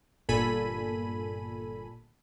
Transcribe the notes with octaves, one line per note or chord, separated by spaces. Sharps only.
G1 A#2 A4 G#5 B5 D#7